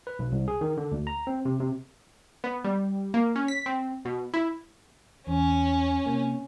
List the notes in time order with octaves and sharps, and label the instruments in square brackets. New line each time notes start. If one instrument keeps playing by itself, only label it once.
[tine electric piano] B4
B1
C2
G#4
D#3
D3
D2
A#5
C4
C3
C3
[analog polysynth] B3
G3
A#3
C#4
B6
C4
B2
E4
[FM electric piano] E2 [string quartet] C#4
[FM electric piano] C3 A#3